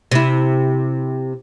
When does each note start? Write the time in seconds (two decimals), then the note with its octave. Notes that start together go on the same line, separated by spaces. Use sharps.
0.12 C3 E4